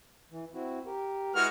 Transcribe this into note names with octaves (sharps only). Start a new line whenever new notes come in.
E3
C4 E4 F#4
G4 A#4
G#3 E4 F#4 B4 F6